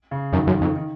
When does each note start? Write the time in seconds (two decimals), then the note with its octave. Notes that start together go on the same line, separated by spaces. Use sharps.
0.11 C#3
0.32 F#2 D#3
0.47 F#2
0.53 D#3
0.61 F2
0.76 D#3